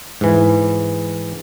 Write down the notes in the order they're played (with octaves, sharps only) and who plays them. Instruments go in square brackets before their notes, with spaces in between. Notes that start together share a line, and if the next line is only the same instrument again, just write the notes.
[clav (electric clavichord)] G#2 E3